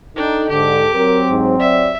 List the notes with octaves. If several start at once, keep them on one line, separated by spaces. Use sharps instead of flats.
D4 D#4 A4 G5
G#2 D3 G4 D6
F#3 C4 A#4
G#2
D5 E5